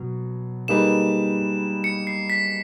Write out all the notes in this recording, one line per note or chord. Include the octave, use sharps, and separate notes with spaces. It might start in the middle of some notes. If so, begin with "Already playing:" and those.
Already playing: B2 F#3
G3 A#3 D#4 G#4 B4 E7
C#7
C7
B6